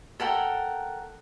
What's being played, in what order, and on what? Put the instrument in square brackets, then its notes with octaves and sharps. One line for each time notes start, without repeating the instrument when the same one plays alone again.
[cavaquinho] A4 A#4 F#5 G5